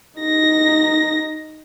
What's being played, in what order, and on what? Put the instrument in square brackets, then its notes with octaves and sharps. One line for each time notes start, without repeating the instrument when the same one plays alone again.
[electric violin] D#4 A#6